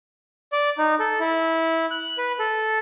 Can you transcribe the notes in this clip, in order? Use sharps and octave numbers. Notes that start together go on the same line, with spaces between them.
D5
D#4
A4
E4
F#6
B4
A4